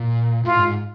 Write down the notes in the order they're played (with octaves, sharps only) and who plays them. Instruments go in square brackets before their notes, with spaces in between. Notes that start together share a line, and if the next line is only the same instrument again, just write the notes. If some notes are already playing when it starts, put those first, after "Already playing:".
Already playing: [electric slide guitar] A#2
[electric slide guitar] A2 [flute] F4
[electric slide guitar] G#2